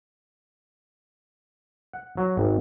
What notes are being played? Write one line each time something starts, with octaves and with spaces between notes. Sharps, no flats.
F#5
F#3
G#1